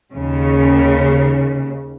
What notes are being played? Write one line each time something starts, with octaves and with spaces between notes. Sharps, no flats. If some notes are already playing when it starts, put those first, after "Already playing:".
D#2 C#3